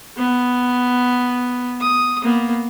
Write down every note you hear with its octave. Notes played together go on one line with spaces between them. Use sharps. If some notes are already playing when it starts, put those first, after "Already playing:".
B3
D#6
A#3 B3